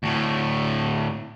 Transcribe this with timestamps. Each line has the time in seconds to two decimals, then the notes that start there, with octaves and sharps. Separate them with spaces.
0.03 D2 A2